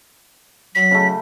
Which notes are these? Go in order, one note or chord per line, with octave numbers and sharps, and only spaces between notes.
F#3 B6
C#3 A3